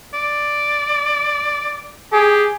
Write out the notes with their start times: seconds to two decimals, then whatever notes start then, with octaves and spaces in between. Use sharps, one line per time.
0.14 D5
2.12 G4 G#4